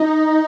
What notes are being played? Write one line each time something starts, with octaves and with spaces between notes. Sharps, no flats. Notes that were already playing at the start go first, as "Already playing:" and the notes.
Already playing: D#4